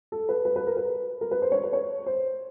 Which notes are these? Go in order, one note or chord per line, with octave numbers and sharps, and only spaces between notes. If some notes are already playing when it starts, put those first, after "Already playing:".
A4
B4
B4
B4
A#4
B4
A#4
B4
C5
C#5
B4
C#5
C5